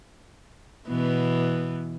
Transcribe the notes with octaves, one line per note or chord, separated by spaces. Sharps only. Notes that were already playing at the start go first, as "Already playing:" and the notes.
B2 E3 B3